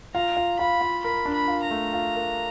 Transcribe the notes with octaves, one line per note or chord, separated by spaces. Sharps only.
F4 A#5
F4
F4 B5
F4
A#4 B5
D4
B5
F4
A#5
A3
F4
A#4